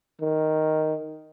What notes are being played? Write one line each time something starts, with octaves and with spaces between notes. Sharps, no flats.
D#3